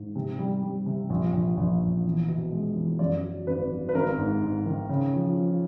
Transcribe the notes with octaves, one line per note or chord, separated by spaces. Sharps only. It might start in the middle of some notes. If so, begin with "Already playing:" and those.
Already playing: G#2
C3
G3
G3
C3
A#1
A#1
A#1
A#1
E2
B2
G#3
E2
F#2 D5
F#3
G#1 B4
F#3
B4
G#1 A#4
G#2
G#2
D#3
C#3
F3
F3